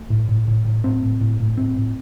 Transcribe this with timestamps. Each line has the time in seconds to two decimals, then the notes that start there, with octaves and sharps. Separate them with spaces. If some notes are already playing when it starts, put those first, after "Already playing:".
Already playing: A3
0.10 A2
0.29 A2
0.48 A2
0.65 A2
0.84 A2 C4
1.03 A2
1.21 A2
1.40 A2
1.57 A2 C4
1.76 A2